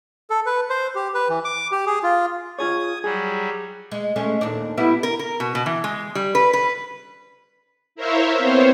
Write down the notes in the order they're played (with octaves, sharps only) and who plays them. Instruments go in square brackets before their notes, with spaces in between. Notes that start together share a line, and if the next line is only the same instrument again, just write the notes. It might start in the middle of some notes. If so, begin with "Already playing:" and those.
[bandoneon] A4
B4
C5
G4
B4
E3
D6
G4
G#4
F4
[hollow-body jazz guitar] F4 G#4 C#5 [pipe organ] D#6 G#6
[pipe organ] F#3 G3 [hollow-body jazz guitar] G#4
[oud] G#3
G#3 A3 C#4
D#2 A#2 D4
G3 B3 E4
[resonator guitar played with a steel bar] A#4
A#4
B2
B2
E3
G#3
G3
B4
B4
[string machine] E4 A#4 C5 C#5 E5 F5
B3 C4 C5 C#5